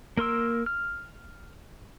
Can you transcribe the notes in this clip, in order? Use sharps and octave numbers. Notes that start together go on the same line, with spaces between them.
A#3 A#4 C6 E6
F6